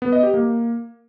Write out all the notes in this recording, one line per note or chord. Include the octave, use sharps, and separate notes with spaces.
B3
D#5
G4
A#3